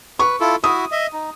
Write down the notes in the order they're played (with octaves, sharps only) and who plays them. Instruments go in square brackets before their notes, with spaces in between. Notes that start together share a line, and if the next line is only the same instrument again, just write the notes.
[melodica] B4 [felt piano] C#6
[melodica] E4 F4 A4
[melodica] E4 F#4 E5 [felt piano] D#6
[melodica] D#5 E5
D#4